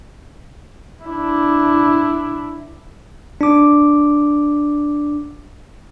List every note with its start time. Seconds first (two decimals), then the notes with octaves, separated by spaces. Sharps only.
1.04 D4 E4
3.41 D4 D6